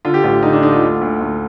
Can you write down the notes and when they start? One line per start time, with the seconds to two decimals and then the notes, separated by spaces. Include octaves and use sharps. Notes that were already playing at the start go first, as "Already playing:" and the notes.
0.05 D3 F4
0.14 G4
0.24 A1 F4
0.43 D3 D#4
0.53 D4
0.62 D3 D#4
0.72 F4
0.82 D2
1.01 D2
1.21 D2